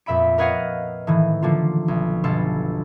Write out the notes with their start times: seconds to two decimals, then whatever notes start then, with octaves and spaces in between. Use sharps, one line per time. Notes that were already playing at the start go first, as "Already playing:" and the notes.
0.06 F2 A#2 E5 B5 D7
0.38 A#4 B4 C#5 D#5 F5 F#5
1.07 A2 D#3 E3
1.42 D3 F3 A#3 F4
1.88 B1
2.24 G1 B2 F4 A4